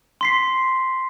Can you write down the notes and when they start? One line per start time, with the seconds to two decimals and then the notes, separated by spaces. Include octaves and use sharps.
0.21 C6 B6 C7